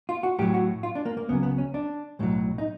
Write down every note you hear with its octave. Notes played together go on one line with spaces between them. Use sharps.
F4
F#4
A2 F#3 G4
F#4
F4
D4
A#3
A#3
C#2 C#3 F#3 B3
B3
C#4
D4
B1 A2 F#3
D#4